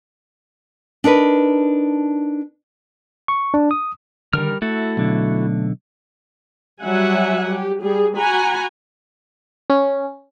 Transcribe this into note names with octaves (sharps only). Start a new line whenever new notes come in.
D4 D#4 A#4 B4
C#6
D4
D#6
D3 D#3 G3 A#4 F6
A3 E4 F#4 A4
B1 D3
F#3 G3 E5 F#5 G#5
G4
G3 G#4
F#4 F#5 G#5 A#5 B5
C#4